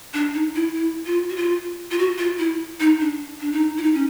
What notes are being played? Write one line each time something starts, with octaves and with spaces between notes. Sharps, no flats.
D4
D#4
E4
E4
F4
F#4
F4
F4
F#4
F4
E4
D#4
D4
D4
D#4
E4
D#4
C#4